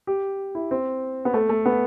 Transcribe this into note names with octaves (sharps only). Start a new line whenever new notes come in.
G4
E4
C4
B3
A3
A3
B3